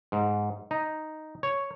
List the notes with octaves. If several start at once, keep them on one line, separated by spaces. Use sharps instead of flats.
G#2
D#4
C#5